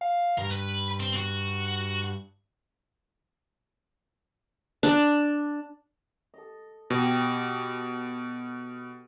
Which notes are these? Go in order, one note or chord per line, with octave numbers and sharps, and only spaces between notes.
F5
G2 A#4
B4
C4
F#4
D4
A4 D#5
B2 G4